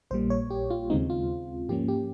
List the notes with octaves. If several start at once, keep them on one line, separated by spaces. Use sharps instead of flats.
A#1 A#2 G3 A#3 C5
C#5
G4
F4
D#2 C#3 G#3 C4 D#4
F4
G#2 F3 A#3 C#4 G4
G4